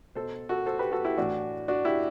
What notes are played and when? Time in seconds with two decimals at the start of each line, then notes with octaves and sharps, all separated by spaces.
0.15 B2 A4 C5
0.49 F#4 A4
0.66 A4 C5
0.79 G4 B4
0.92 F#4 A4
1.04 E4 G4
1.17 A2 E3 D4 F#4
1.68 D4 F#4
1.85 E4 G4